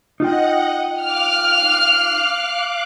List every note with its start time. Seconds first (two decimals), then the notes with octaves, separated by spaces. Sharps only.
0.20 D#4 F4 D#5 F#5 G5
1.02 F5 D6 F6 F#6